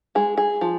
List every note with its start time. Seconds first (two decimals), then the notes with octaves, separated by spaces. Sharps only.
0.15 G#3 G#4
0.37 G#4
0.61 F3